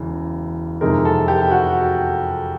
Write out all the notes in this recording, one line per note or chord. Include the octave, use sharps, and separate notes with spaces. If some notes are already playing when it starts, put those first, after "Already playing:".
Already playing: E1 C#3 E3
F2 C3 D#3 G#3 A#4
A4
G4
F#4